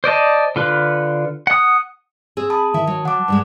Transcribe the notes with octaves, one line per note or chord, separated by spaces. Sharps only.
C5 D5 D#5 A5
D3 F4 B4
F#5 D#6
C4 G#4 E6
A5 B5 D#6
D#3 E4 E5
F#3
F#5 A5 D6
G2 F3 G#3